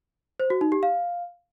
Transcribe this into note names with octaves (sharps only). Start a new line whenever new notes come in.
C5
F#4
D#4
G4
F5